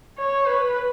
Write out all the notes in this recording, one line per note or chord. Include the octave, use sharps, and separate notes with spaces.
C#5
B4